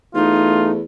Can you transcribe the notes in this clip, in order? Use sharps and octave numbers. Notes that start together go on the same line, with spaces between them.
E2 A3 D#4 F4